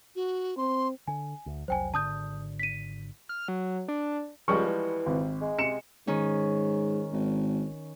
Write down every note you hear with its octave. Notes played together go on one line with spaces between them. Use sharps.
F#4
C4 C6
D3 G#5
D2
F1 C2 F#3 C5 G5 G#5
G#1 D3 A5 D#6 G6
B6 D#7
F6
F#3
D4
C#2 F3 G3 G#3 C#6
E3
G#1
G#3
C3 C#7 E7
G#2 D#3 C#4
G#1